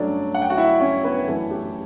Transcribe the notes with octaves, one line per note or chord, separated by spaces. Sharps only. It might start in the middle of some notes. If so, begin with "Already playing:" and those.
Already playing: G2 F#3 A3 C#4 D4 D5
F#5
G5
F#4 F#5
E4 E5
C#4 C#5
B3 B4
F#2 E3 A3 C#4 A4
G4